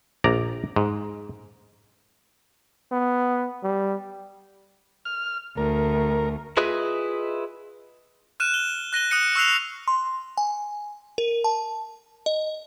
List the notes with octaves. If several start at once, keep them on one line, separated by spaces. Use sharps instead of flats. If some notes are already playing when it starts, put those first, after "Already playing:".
A#1 D5 A#5
G#2
B3
G3
F6
D2 A#4
E4 F4 G#4 B4 D#5
F6 F#6 D#7 E7
G7
F#6 A#6 D#7 G7
D#6 F#6 C#7 D#7
C#6 E6 F#6 C7 F7
C6
G#5
A#4
A5
D#5